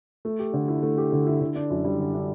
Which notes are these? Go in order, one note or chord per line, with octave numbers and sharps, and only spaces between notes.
A3
G4
D3
E4
A3
G4
D3
E4
D3
D4
F#2
G3
D3
D4